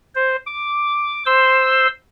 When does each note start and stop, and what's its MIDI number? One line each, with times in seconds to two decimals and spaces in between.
0.15 0.36 72
0.46 1.23 86
1.26 1.87 72
1.26 1.87 84
1.26 1.87 88